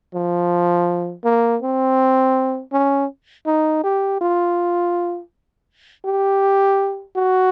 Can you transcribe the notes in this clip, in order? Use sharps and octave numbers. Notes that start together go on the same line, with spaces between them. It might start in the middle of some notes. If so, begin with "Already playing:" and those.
F3
A#3
C4
C#4
D#4
G4
F4
G4
F#4